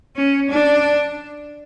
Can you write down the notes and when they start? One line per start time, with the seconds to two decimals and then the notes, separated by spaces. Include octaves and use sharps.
0.16 C#4
0.50 D4